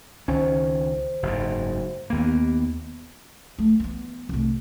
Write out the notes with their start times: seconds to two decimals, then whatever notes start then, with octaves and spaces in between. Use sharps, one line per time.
0.28 C#2 D#3 C#4 C5
1.23 F#1 G#2
2.10 D#2 A#3 B3
3.59 A3
3.80 E3 B3
4.29 C2 A2